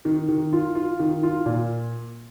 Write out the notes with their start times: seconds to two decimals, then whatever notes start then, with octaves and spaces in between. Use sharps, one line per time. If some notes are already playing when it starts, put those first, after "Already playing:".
0.05 D#3
0.29 D#3
0.53 F4
0.75 F4
0.99 D#3
1.23 F4
1.46 A#2